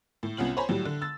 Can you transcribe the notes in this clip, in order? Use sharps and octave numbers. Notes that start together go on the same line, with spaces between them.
A2
C2 B3 C#4 F4 F#7
C5 C#5 G#5 A#5 B5
A2 F#3 G3
D3
E6 A6